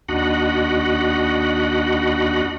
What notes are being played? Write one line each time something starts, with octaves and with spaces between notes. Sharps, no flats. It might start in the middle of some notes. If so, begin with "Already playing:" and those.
D#2 D4 F#4 D#5 F#5 B5